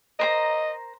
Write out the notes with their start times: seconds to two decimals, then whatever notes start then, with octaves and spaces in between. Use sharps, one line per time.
0.19 A#4 C5 D#5 A#5